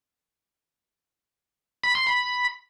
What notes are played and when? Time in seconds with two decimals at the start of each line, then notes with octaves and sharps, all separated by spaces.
1.84 B5
1.95 C6
2.07 B5